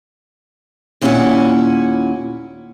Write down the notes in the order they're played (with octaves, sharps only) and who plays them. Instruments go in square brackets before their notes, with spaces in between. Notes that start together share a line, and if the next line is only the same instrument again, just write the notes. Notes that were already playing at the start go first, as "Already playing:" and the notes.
[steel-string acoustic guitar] D#2 A#2 C#4 E4 A4 F#5